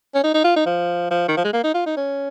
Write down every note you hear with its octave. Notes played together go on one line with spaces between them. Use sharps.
C#4
D#4
D#4
F4
D#4
F3
F3
D#3
F3
G#3
A#3
D#4
F4
D#4
C#4